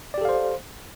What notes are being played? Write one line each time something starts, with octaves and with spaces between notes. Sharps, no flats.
G4 A4 C5 D5 F5